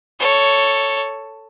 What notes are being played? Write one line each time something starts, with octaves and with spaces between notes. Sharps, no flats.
A4 C#5